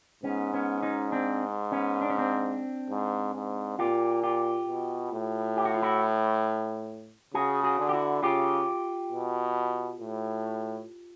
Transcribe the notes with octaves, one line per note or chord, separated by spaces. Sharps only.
G#2 B3 C#4
B3 C#4
C#4 D#4
C4 D4
B3 C#4
D4
C#4
C4 D4
G#2
G#2
A#2 F4 G4
F4 G4
B2
A2
G4
F#4
F4
E4 F#4
C#3 F#4 G#4
F#4 G#4
D3
G4
E4 F#4
C#3 F4 G4
B2
A2